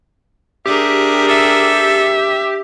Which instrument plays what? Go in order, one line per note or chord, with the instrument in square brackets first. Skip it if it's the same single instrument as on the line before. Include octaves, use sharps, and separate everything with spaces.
[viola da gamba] D4 G#4 A#4 [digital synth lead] G4 [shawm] E5
[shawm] A4 [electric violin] E5